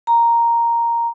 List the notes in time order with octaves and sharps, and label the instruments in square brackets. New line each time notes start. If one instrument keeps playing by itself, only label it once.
[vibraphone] A#5